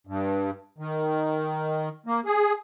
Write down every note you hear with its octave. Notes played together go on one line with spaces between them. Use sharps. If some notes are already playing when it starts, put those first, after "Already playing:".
G2
D#3
A#3
G#4